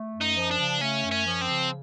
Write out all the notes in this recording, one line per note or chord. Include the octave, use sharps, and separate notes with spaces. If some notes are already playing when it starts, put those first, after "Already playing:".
Already playing: A3
F#2
D#4
F3
D4
C#3
A3 C#4
F#2
C#4
F3
C4
C#3